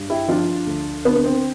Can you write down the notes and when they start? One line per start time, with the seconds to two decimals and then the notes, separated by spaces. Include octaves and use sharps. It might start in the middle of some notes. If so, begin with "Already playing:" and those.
Already playing: G2
0.10 E4 G4
0.28 F3 D4 F4
0.67 D2
1.05 D3 B3 D4
1.15 B3
1.24 C4